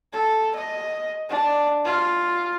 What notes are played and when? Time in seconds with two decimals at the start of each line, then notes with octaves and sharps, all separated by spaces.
0.13 A4
0.55 D#5
1.29 D4
1.84 F4